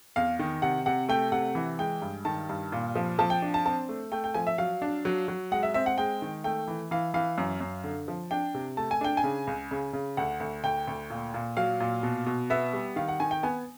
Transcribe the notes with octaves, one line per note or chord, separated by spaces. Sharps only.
E2 F5
D#3
C3 F#5
C3 F#5
A3 G5
C3 F#5
E3
G#3 G5
G2
D#3 A5
G2
A#2
F3
F3 A5
G5
D4
A5
C4 A5
A3
A3 G5
G5
F3 G#5
E5
F#3 F5
D4
F#3
F#3
G#3 F#5
E5
C4 E5
F#5
G#3 G5
D#3
A3 G5
E3
E3 F5
E3 F5
F#2
F#2
D3
F3
D4 G5
C3
A3 A5
G#5
D4 G5
G#5
C#3
C#2
C#3
C#3
D2 F#5
D2
D2 G5
D2
A#2
A#2
F#3 F5
A#2
B2
B2
B3 E5
G3
D#3 F5
F#5
D#3 G#5
G5
B3 G#5